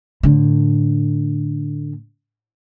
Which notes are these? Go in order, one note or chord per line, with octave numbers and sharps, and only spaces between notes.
A2 D3